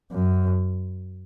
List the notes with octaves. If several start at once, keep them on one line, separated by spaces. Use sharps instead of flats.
F#2